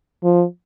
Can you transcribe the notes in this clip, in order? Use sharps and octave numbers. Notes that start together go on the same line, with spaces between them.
F3